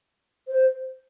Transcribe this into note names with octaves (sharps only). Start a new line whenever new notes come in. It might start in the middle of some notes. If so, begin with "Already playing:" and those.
C5